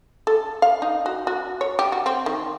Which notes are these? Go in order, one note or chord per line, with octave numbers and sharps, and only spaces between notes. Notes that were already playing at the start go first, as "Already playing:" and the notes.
A4
F5
D#4
F#4
F#4
C#5
G4
F#4
C4
D#3